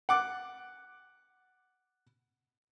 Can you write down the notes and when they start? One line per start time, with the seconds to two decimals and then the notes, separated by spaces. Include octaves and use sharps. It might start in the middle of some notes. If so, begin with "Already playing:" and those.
0.09 F#5 D6